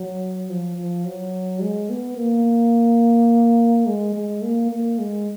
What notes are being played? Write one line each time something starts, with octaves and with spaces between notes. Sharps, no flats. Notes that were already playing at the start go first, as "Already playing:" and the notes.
Already playing: F#3
F3
F3
F#3
G#3
B3
A#3
G#3
G#3
A#3
A#3
G#3